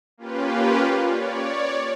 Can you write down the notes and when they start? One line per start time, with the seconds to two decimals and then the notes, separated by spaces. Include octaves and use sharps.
0.18 A#3 C#4 F4 G4 B4
1.02 C#5 D5